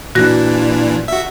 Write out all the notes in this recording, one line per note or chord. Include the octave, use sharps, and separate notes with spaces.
A#2 E3 D4 F#4 A#6
F#4 E5